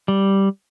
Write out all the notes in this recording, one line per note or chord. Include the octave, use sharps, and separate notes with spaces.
G3